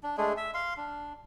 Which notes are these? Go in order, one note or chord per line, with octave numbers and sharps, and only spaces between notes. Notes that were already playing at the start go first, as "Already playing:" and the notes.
D4
G#3 A3 D4 G#4
E5
F5 C6
D4